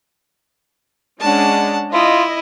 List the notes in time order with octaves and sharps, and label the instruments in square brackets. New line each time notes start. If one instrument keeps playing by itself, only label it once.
[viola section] G#3 C#4 D4 [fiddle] F#5 A5
[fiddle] E4 [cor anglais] F4 [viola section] D#5